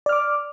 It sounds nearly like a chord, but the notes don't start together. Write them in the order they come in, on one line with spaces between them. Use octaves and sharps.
D5 F6 D6